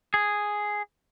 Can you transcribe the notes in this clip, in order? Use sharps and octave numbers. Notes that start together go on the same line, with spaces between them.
G#4